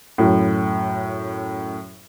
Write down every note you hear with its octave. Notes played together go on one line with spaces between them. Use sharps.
F#2 A2